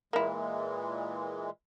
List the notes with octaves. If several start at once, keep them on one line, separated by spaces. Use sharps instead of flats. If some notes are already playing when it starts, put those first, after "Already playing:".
A#2 E3 G#3 A#3 E4